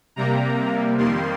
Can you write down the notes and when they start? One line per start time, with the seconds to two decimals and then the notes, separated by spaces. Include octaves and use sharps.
0.16 C3 G3 A#3 A#5
0.98 F2 D#3 G3 A#3 C6